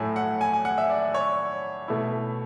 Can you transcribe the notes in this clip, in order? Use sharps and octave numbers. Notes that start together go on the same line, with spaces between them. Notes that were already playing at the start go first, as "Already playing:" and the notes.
Already playing: A2 F#3 A3 E4 G#5
F#5
G#5
G#5
F#5
E5
D5
C#5
B2 A3 E4